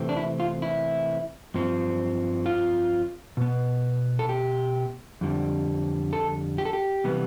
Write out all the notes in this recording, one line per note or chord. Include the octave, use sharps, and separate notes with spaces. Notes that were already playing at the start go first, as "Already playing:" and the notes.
Already playing: C3 E3 A3 C4
D4
E4
F4
E4
G2 F3 C4
F4
B2 B3
A4
G4
F2 D3 G3
A4
G4
A4
G4
C3 E3 G3 B3